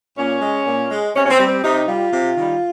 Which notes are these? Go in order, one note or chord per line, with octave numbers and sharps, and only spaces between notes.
A#2 C#4
G#3
A#2
G#3
C3 C#4
C#4
C4
G3
C4
C3 D#4
G3 F4
C3
D#3 G3